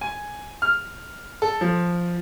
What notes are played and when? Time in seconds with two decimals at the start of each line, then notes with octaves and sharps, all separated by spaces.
0.01 G#5
0.62 F6
1.42 A4
1.61 F3